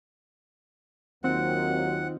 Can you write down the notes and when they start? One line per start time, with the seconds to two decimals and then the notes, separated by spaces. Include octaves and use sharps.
1.24 D#2 D#3 F#3 A#3 C4 D#4 F4 F#5